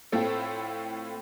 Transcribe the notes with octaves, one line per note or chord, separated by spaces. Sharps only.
A2 A3 C4 E4 F4 A4